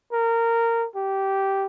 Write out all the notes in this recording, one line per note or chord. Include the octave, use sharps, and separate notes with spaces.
A#4
G4